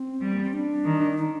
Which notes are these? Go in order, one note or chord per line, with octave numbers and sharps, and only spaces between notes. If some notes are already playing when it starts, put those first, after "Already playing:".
Already playing: C4
G3
A#3
C4
D4
D#3
D#4